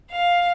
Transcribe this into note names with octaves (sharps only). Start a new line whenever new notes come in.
F5